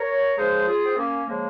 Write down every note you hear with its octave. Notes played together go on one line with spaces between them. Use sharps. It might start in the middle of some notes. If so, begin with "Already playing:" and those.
Already playing: A#4 C#5
D#2 C#3 F3 G#3 G#4 C5
F4 G#4
C4
A#3 C#4
C#3 F3 G#3 A#3